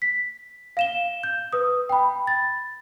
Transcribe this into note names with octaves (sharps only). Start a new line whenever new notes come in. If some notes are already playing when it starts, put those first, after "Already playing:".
B6
F5 E7 G7
G6
B4 D#6
G5 B5
A6